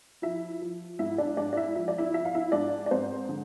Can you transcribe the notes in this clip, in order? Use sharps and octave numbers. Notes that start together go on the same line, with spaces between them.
F3 E4 E5
F3
G#2 E4 E5
D4 D5
G#2 D4 D5
D5
E4 E5
F3 E5
D5
E4 E5
F3 E5
F5
E4 E5
G#2 D4 D5
D5
G#2 C4 C5
D3